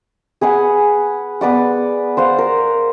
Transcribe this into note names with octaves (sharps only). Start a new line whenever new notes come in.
G#4 B4 F#5 G#5
B3 B4 D5 F#5
C5 F5 F#5
A#4